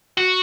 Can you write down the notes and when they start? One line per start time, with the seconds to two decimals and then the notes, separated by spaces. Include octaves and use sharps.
0.18 F#4